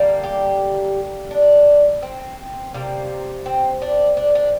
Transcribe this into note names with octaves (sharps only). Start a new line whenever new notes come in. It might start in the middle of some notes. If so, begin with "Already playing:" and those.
Already playing: D3 G3 A#3
G4
D4
C4
C3 G3 A#3
C4
D4
D4
D4